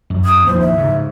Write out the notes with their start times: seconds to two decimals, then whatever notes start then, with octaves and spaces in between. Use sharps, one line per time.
0.10 F#2
0.25 D#6
0.46 D#2 A2 F3 C5
0.60 E5
0.78 G#2 C#3